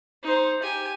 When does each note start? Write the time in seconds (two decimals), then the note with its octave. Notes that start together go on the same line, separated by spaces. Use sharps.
0.23 D#4 C5
0.63 G4 G#5